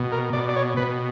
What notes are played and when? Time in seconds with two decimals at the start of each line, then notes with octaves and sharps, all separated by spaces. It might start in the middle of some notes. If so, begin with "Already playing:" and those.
Already playing: B2
0.12 A#4
0.33 B2 D5
0.49 D5
0.56 C#5
0.77 B2 B4